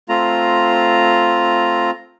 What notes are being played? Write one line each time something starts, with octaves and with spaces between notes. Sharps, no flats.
A3 C4 F4 A#5